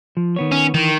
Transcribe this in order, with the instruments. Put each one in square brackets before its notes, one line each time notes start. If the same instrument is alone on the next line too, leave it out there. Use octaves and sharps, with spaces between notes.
[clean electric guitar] F3
D#3 B3 C#5
[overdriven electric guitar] C#4
[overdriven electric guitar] D#3 [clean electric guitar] E3